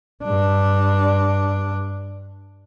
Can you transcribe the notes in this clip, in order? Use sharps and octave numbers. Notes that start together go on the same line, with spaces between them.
G2 D4